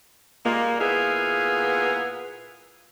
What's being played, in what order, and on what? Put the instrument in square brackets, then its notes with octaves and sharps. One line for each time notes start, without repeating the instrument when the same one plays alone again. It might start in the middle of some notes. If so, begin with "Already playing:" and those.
[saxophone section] A#2 G3 G#3 A#3
A#2 B3 E4 G#4 F5